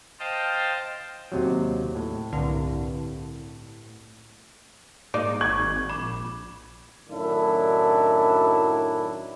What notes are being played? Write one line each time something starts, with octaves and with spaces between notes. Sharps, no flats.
C5 D#5 F5 G5 A5
D#2 C3 F#3
A2
C2 G2 D3
G#2 A#3 D#4 D5 D6 D7
G#1 C#6 G#6
A#1 B5 D6
F#2 A2 D#3 F#3 D4 E4